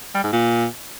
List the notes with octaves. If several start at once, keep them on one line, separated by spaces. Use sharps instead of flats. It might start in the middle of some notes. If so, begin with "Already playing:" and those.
G3
G#2
A#2